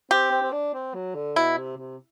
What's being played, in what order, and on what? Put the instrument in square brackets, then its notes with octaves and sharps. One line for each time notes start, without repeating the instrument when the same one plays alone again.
[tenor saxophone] C4 [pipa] G4
[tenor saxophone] C4
C4
D4
C4
F#3
D3
[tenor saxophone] B2 [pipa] E4
[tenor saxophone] C3
C3